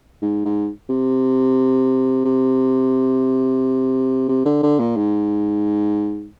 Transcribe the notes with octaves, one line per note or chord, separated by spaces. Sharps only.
G#2
G#2
C3
C3
C3
D3
D3
A#2
G#2